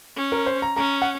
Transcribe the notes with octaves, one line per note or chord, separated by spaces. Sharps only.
C#4
A#4
C5
A#5
C#4 A#5
F#5